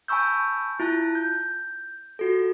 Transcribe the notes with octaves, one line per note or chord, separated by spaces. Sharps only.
G#5 A5 B5 C#6 E6 G6
E4 F4 A5 F#6
G6
F4 F#4 A4